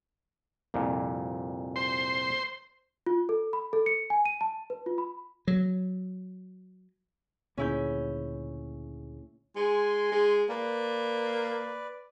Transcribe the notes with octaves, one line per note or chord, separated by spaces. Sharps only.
C2 F2 A#2
C5 C6
F4
A4
B5
A4
C#7
G#5
D#7
A5
B4
F4
B5
F#3
D2 A#2 C#3 C#4 E4 G6
G#3 G#5 C6
G#3
A#3 B4 D5